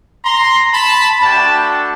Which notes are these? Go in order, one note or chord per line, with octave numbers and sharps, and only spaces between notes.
A#5 C6
A5 B5
A3 D4 F#4 G5 A5